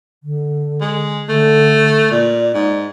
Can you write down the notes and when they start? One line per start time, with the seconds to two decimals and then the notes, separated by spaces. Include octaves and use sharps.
0.23 D3
0.81 G#3
1.29 D3 A3
2.11 A#2 D5
2.54 G#2